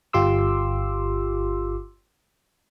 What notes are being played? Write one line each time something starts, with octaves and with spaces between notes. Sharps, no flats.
G1 F4 G4 C6 D6 E6